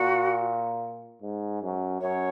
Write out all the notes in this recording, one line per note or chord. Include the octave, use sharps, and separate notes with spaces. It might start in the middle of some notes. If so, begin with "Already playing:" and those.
Already playing: A#2 F#4
G#2
F#2
F#2 C#5